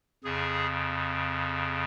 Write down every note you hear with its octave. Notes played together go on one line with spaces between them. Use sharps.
F2 C#3 G#4